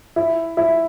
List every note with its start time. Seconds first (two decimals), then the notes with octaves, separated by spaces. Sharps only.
0.16 E4
0.57 E4